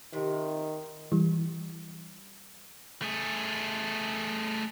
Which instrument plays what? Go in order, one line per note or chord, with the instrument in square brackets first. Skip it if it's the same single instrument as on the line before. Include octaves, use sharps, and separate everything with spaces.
[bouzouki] C3 F3 [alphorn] D#3
[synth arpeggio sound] E3 G3
[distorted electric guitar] A3 G#4